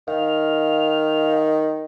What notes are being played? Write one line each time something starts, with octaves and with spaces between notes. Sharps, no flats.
D#3 F5